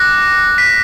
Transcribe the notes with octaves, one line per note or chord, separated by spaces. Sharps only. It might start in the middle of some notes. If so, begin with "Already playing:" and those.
Already playing: D6 F#6 A#6
B6